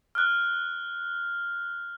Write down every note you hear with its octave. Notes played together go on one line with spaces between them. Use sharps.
F6 F#6